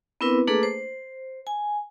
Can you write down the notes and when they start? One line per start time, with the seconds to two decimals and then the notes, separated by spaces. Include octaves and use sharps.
0.21 B3 C4 D4 E4 A#4 B4
0.48 A3 A#3 D4 G#4 A4 B4
0.63 C5
1.47 G#5